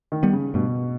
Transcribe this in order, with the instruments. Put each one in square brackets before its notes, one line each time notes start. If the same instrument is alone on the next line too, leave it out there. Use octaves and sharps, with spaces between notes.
[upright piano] D#3
[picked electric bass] G3 B3
[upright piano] C#3
[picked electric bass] G2 [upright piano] B2